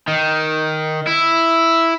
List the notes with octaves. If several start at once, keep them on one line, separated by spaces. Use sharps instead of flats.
D#3
E4